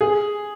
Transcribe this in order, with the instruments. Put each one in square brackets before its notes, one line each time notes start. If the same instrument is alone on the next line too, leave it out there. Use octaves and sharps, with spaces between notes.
[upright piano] G#4